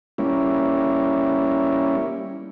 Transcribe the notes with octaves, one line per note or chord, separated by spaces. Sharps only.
G3 A#3 C#4 E4